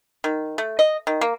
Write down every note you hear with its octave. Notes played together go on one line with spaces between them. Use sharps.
D#3
A3
D#5
D#3
A#3